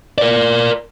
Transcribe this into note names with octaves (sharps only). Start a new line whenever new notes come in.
A#4 D5